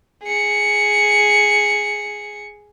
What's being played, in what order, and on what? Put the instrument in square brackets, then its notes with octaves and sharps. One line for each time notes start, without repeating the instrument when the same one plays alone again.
[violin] G#4 C#7